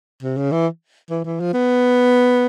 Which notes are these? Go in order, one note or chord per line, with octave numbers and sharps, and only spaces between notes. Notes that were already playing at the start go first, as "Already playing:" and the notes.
C3
C#3
E3
E3
E3
F3
B3